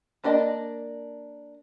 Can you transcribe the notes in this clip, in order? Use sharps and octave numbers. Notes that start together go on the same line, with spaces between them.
A#3 D4 D5 D#5